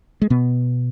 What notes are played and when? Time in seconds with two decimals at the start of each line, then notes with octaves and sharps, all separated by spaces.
0.22 G#3
0.30 B2 B3